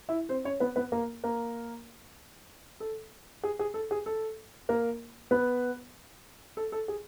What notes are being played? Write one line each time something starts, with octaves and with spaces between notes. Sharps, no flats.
E4 E5
C4 C5
C#4 C#5
B3 B4
B3 B4
A#3 A#4
A#3 A#4
A4
G#4
G#4
A4
G#4
A4
A#3 A#4
B3 B4
A4
A4
G#4